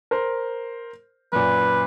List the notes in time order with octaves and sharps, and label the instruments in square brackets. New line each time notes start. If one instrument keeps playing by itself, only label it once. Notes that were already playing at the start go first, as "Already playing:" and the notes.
[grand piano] A#4 C5
[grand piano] F#2 A#2 [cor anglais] B4